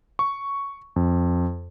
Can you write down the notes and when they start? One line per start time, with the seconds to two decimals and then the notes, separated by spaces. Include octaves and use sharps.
0.19 C#6
0.96 F2